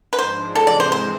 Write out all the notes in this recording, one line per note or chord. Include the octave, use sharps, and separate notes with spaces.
B4
G#2 F3 G#3 D4 C5
C3 E3 G#3 A4
D5
C5
C5